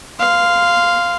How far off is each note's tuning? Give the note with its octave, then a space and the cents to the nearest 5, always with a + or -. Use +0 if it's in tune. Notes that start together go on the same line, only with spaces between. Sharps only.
F5 +0 C6 -20